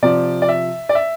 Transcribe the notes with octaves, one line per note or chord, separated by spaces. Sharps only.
C3 F3 D5
D5
E5
D5
E5